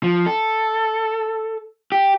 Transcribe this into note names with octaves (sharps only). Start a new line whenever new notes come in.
F3
A4
G4